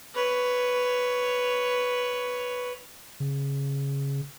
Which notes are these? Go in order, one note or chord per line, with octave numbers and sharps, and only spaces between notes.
B4 C#5
C#3